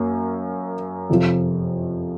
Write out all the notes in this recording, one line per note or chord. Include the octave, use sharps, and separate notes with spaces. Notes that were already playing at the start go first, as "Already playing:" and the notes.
Already playing: F#2 A#3
F2 C3 F3